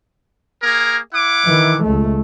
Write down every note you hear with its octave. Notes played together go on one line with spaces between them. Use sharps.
A#3 G#4 A#4
E4 F#5 D6
D#3 E3
C#2 A3